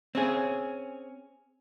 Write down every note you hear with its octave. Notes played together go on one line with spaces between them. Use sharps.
C4 C#4 G#4